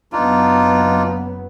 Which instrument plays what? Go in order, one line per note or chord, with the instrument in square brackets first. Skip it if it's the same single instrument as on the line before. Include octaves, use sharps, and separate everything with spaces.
[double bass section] F#1 F#3 B3 [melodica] D4 D#4 F4